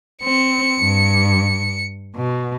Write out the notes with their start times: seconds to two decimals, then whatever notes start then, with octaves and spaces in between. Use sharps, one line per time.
0.23 C4 C#7
0.80 G2
2.16 B2